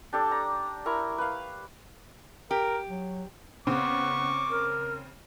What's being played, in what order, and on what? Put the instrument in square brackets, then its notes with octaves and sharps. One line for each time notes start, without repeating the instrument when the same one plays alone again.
[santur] D4 G4 A4
A#5
E4 A#4 C#6
B4 F5
[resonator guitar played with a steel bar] G4 [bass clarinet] A#4
[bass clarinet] F#3
[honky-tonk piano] C#3 C4 [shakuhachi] B3 [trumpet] C#6 [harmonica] D6
[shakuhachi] A#4